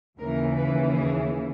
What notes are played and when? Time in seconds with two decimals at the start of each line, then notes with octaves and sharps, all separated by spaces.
0.19 D#2 C#3 E3 A#4
0.56 B4
0.94 G#4